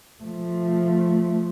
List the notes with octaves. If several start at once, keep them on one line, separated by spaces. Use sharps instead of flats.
F3 A3